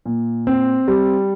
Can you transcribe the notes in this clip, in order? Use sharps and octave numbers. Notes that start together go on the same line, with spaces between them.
A#2
C4
G3